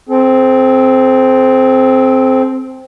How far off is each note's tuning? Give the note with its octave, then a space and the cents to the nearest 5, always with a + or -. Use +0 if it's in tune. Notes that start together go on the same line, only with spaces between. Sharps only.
C4 +0 A4 -45